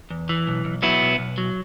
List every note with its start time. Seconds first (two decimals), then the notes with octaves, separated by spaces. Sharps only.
0.11 E2
0.29 E3
0.47 B1
0.65 B1
0.82 F#3 B3 E4
1.01 B1
1.18 B1
1.38 F#3